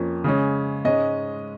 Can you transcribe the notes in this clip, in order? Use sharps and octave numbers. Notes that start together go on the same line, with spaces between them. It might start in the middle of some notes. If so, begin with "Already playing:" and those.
Already playing: F2 F3 A#3 C#4
C#3 G#3 C#4
G#2 G#3 C#4 D#5